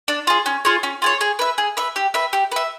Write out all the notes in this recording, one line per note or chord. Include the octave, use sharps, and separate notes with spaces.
D4
F4 G#4
C#4
F4 G#4 C#5
C#4
F4 G#4 C#5
G#4
B4 E5
G#4
B4 E5
G4
B4 E5
G4
B4 E5